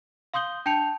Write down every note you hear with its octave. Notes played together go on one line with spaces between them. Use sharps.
F5 C6 D#6 G6 G7
D4 G5 A5 G6 C#7 F7